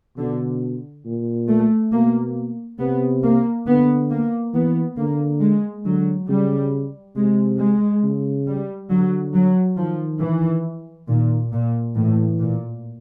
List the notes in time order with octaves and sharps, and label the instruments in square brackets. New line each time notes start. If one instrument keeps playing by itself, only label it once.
[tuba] B2 [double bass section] D3
[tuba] A#2
[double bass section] A3
[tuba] B2 [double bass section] A#3
[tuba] C3 [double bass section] B3
[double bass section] A#3
[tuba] D3 [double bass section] B3
[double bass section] A#3
[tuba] E3 [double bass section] B3
[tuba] D3 [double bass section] A#3
[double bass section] G#3
[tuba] D3 [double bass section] F#3
[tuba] C#3 [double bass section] G3
[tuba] C3 [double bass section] G#3
[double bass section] G#3
[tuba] C#3
[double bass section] G3
[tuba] D3 [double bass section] F#3
[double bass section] F#3
[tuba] D#3 [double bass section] F3
[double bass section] E3
[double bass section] A#2 [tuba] D#3
[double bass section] A#2
[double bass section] A2 [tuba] E3
[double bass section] A#2